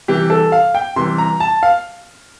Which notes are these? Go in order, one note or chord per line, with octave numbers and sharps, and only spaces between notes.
C3 E3 G3 G4
A4
F5
G5
C3 E3 G3 C6
A#5
A5
F5